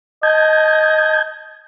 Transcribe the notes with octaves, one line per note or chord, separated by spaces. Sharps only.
D#5 A5 G6 G#6